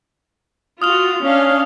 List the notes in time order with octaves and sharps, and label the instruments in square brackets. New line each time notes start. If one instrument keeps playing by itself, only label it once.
[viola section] F4 F#4 [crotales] D#6 F6 F7
[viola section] C#4 D4 F5